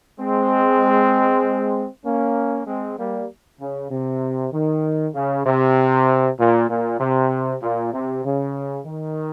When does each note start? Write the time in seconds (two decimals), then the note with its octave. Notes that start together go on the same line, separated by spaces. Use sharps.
0.20 G#3 C4
2.05 A#3 C#4
2.67 G#3 C4
2.99 G3 A#3
3.61 C#3
3.91 C3
4.53 D#3
5.15 C#3
5.46 C3
6.39 A#2
6.70 A#2
7.00 C3
7.63 A#2
7.93 C3
8.25 C#3
8.86 D#3